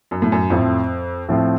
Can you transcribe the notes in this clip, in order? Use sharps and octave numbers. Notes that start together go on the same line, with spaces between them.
F#2
A2
F#2
F2 A2 F3 C4 F4
A2 F3 C4 F4